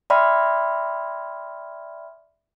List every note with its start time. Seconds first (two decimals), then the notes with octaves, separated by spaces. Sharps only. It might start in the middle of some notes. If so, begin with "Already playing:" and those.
0.10 D5 E5 G5 B5 C6 F6